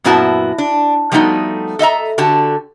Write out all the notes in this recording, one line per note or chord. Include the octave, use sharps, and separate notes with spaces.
F#2 A#2 B3 E4 F#4 A5
D4
F3 G3 A3 B3 D#4 F#4
A4 D#5 E5 A#5
D3 F#4 G4 A5